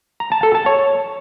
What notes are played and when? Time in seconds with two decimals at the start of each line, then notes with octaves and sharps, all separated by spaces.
0.20 A#5
0.32 A5
0.43 A4
0.55 A5
0.66 C#5